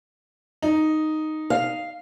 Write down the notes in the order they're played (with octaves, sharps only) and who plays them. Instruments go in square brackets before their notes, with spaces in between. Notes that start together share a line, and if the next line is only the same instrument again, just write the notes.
[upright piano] D#4
[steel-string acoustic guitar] F5